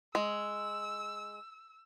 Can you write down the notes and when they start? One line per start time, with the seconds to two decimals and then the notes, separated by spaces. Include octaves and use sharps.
0.15 G#3 E6